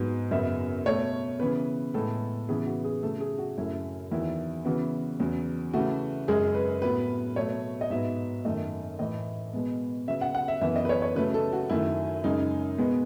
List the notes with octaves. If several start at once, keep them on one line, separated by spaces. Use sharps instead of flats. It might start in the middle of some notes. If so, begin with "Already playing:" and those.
Already playing: G#2 F#3 B3
F#2 C#3 F#3 B3 E5
B2 A3 C#5
C#3 E3 B3 B4
A2 G#3 B3 A4
C#3 E3 B3 G#4
F#4
G#4
C#3 F#3 A3 A4
G#4
F#4
F#2 C#3 F#3 A3 E4
E2 D#3 F#3 E4
C#3 E3 B3 F#4
E2 C#3 F#3
C#3 E3 A3 F#4
F#2 C#3 G#3 G#4
B4
A2 F#3 B3 B4
B2 F#3 A3 C#5
D#5
G#2 F#3 B3 E5
F#2 D#3 A3 D#5
A2 E3 A3 D#5
B2 G#3 B3
C#3 F#3 B3 E5
F#5
F#5
E5
F#2 E3 B3 E5
D#5
B4
C#5
C#5
C#3 F#3 A3 B4
A4
F#4
F#2 D#3 F#3 A3 E4
F#2 C#3 G#3 D#4
B2 G#3 B3